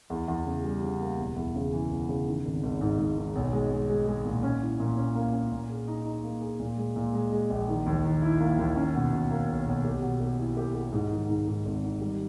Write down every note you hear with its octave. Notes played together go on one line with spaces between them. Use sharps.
E2
E2
C#3
G3
C#3
A#3
E1
E2
C#3
E3
E1
C#3
D#3
G#1
G#1
G#2
G#2
D#3
B1
G#3
G#3
G#3
G#3
A#2
C#4
E4
A#2
C#4
A#3
C#4
A#2
G#4
D#4
D#4
A#3
G#4
A#2
G#3
A#2
G#3
G#3
A#1
D#3
D#2
D#3
E4
A#3
D#2
C#4
B2
B2
A#3
B1
B1
G4
B2
G4
E4
G4
G4
G#2
D#3
G#2
G#2
G#1
D#3
G3